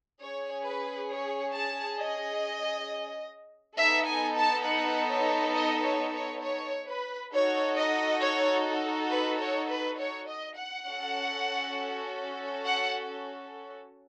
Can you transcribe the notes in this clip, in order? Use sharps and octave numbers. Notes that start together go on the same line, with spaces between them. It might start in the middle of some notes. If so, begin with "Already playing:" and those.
C#4 G#4 C#5
B4
C#5
A5
D#5
B3 D#4 A4 E5
G#5
A5
F#5
C#5
D#5
C#5
C#5
C#5
B4
D#4 F#4 A4 C#5
D#5
C#5
B4
C#5
B4
C#5
D#5
F#5
C#4 F#4 A4
F#5